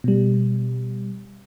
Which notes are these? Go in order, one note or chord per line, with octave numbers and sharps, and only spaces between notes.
B2 G3